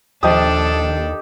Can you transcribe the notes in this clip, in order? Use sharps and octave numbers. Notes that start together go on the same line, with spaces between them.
A#1 D#2 F3 D4 G4 A4 D#5 D#6